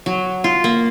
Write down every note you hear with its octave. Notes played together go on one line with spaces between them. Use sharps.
F#3
F4
A#3